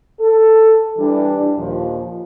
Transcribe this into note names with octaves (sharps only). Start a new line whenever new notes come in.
A4
E3 G3 D4
D#2 A#2 F3